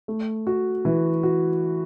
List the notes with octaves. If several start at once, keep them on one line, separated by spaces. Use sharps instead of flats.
A3
F#4
E3
F#4